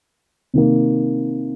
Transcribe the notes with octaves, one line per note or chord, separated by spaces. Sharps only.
C3 D#3 A#3